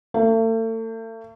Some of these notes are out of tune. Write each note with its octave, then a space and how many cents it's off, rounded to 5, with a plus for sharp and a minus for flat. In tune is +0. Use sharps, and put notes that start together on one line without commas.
A3 +40